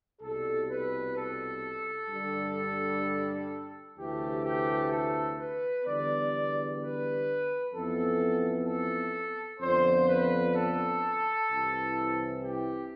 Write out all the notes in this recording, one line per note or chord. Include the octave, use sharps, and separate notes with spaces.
C2 B2 G3 A4
B4
A4
G2 D3 G3
D2 C3 E3 A3 G4
G4
A4
B4
E2 D3 G3 B3 D5
B4
F2 E3 B3 A4
A4
F2 D3 F3 B3 C5
B4
A4
C2 C3 E3
G4